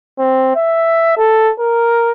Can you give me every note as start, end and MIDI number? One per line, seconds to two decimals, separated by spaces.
0.19 0.52 60
0.56 1.15 76
1.17 1.52 69
1.60 2.12 70